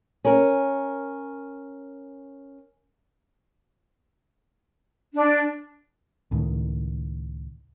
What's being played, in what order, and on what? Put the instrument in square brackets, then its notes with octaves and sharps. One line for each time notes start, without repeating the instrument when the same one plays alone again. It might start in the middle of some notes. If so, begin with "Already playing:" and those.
[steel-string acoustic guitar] C#4 A#4
[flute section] D4
[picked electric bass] C#2 A2 D#3